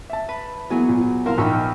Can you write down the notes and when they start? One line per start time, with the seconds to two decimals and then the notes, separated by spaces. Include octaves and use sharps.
0.10 E5 A5
0.29 B4
0.70 E3 F#3 A#3 B3 G#4
0.88 A#2
1.26 C2 A#4 C5 F5
1.38 A#1 D#4 G5 B5 C#6